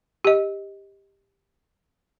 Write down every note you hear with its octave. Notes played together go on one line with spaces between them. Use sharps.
G4 D#5